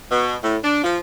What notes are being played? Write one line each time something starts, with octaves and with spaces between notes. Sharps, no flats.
B2
A2
D4
F3